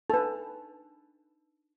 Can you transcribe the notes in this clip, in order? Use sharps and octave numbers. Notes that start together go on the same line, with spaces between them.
D4 D#4 A4 B4